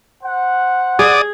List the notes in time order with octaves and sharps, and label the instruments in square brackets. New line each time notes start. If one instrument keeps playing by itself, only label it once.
[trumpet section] C5 F#5
[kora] G#4 [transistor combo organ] D5 D#6